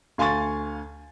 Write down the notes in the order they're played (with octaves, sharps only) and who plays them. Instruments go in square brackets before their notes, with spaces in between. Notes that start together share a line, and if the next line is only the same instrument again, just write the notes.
[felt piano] D2 F5 G#5 C6 C#6 A6